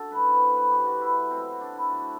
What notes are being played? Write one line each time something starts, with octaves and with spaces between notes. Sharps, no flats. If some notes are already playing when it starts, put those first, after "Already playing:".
Already playing: F#2 D3 F#4 A4
A2 F#3 B4
C5
B4
C5
B4
A2 E3 G4
F#4
E4
B2 F#3 C4
D4
E4
A2 F#3 F#4